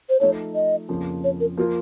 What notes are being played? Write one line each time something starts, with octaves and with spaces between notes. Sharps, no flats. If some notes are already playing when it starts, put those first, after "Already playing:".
C5
F3 A3 D#4 A4 C#5
D#5
F2 C#3 F3 A#3 C#4
C#5
A#4
F3 A#3 F4 F#4 A#4